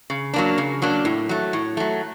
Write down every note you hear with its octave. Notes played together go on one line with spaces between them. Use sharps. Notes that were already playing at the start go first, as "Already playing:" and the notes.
C#3
F#3 A#3 D4
C#3
F#3 A#3 D4
A2
F#3 A3
A2
F#3 A3